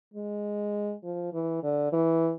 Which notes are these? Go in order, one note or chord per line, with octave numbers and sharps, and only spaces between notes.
G#3
F3
E3
D3
E3